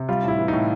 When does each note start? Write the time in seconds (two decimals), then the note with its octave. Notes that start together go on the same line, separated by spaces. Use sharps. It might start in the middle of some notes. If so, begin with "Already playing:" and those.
Already playing: C3
0.09 G3 F4
0.23 A2 E4
0.39 E3
0.48 A2 D#4